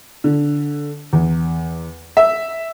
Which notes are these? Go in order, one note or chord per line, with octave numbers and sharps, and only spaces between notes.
D3
E2
E5